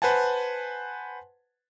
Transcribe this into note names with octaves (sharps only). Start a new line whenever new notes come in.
B4 C5 F#5 G#5 A5